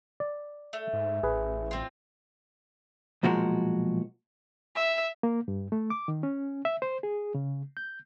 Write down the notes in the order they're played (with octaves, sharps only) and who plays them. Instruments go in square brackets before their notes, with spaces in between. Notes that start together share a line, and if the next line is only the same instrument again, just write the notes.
[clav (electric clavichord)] D5
[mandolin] A3
[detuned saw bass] G#2
[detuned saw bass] A1 [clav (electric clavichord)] G#4 B4
[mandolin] C4 F4
[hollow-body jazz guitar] B1 A#2 F3 G#3 F#4 A#4
[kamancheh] E5
[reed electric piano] A#3
G2
A3
D6
D#3
C#4
E5
C5
G#4
C#3
G6